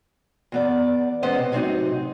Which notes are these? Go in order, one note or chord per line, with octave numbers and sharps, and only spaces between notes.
E2 B3 D5
E2 G#2 B3 C#4 C5 D#5
C3
A2 C3 F#3 C4 C#4 D#4